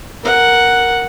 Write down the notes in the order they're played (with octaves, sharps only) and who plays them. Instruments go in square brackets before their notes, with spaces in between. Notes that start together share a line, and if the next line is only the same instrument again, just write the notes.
[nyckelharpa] A#4 F#5